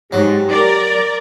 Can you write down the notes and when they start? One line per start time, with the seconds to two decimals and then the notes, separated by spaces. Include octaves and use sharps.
0.12 G#2 F#3 G4
0.48 A#4 D5